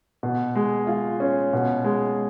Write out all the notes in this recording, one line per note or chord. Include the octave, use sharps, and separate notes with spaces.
B2
G#3
F4
C#4
B2
G#3